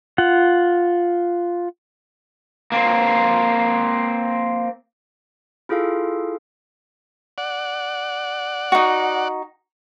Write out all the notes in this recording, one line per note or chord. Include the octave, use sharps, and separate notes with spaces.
F4 F#5
A#3 C4
E4 F4 G#4 A4 F5
D5 F#5
D#4 F#4